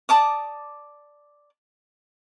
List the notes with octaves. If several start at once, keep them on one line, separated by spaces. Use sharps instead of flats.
D5 A5 D6 D#6